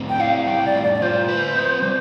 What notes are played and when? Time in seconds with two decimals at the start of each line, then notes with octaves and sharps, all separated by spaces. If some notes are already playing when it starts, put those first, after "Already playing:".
Already playing: A2 C4
0.08 G5
0.19 E4 F5
0.46 G3 G5
0.65 D5
0.75 A2
0.83 D5
0.94 D5
1.01 F4 C5
1.29 B4
1.55 C4
1.82 G3